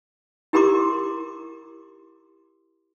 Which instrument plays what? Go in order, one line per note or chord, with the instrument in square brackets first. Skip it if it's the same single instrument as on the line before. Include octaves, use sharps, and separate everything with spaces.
[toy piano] E4 G4 A#4 A#5 C6 D6